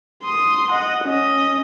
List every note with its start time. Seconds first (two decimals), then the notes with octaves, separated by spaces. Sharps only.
0.23 C6 D#6
0.71 D#5 F#5
1.05 C#4 D#5